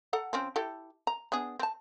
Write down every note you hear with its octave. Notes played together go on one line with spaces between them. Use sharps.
A4 F#5 A#5
F3 C4 C#4
E4 G4 A4
A#5
B3 D4 G#4
C4 A5